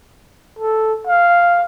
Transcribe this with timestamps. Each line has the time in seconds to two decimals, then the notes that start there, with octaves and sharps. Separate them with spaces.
0.59 A4
1.07 F5